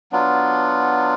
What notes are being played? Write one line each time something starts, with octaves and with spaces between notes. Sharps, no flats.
F#3 B3 D4 F4